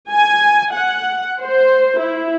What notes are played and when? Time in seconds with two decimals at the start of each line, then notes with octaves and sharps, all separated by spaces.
0.10 G#5
0.72 F#5
1.43 C5
1.99 E4